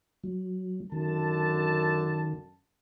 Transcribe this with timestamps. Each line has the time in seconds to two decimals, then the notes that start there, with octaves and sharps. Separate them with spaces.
0.24 F#3
0.92 F#2 D3 D#3 A5